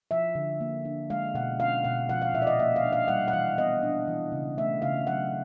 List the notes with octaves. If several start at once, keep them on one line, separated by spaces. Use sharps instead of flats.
F3 E5
D3
A#3
D4
G#3 F5
B2 F#5
C#4 F5
B2 F#5
F3 F#5
F5
A#2 E5
D5
D#5
A#3 E5
F5
D4
F5
G3 F#5
F#5
E3 F5
B3 D#5
D4
E3
C#3
A3 E5
C#3 F5
F#3 F#5